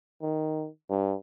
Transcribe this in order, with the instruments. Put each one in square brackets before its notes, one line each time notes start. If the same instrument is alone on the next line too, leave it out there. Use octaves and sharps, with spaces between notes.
[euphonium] D#3
G2